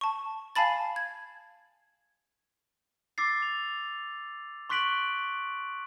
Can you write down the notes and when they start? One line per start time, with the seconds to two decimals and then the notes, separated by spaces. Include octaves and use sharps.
0.01 A5 C#6
0.55 F5 G#5 A5 B5 A6
0.96 G#6
3.18 D6 E6 A6 C7
3.42 F7
4.70 C6 C#6 F#6 B6 D7 F#7